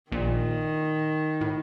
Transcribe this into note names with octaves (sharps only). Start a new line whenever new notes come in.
A#1 A#2 D#3
A2